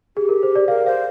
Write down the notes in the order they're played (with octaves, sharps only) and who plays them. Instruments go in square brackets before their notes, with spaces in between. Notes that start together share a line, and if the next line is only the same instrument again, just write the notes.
[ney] G4 [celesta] G#4
[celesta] A#4
C5
D5
[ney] A#4 [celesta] F5
[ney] C5 [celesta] F5